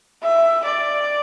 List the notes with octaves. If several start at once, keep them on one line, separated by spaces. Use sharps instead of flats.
E5
D5